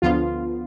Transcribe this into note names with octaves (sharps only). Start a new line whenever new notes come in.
D2 D3 F3 B3 F4